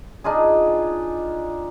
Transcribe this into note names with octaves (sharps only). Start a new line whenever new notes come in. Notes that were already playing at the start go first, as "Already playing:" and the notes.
D4 D#4 F4 G#4